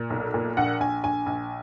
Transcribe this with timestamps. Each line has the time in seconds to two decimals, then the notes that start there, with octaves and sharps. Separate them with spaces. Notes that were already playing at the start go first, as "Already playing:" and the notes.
Already playing: A#2
0.10 B1
0.34 A#2
0.57 A#1 F#5
0.80 A#1 G#5
1.04 A#1 G#5
1.26 A#1